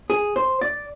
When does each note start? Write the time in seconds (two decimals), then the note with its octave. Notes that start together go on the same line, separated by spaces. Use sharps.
0.10 G#4
0.36 C5
0.61 D5